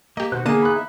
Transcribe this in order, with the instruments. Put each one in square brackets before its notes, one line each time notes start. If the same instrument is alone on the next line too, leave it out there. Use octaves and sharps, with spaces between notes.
[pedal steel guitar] A#3 [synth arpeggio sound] G4 D#5
[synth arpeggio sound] B2 [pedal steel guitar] D#3 C5 F#6 [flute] F#4
[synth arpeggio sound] D3 A5 D#7 [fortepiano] A#3 [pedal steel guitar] B3 D#4 [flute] G#4
[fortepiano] B5 F#6
[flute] E5